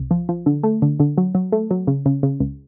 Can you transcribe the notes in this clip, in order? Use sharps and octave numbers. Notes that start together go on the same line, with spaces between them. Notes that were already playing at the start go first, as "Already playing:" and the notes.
Already playing: C2
F3
F3
D3
A3
D3
D3
F#3
F#3
A3
F#3
C#3
C#3
C#3
C#2